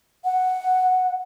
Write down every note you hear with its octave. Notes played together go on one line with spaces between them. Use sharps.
F#5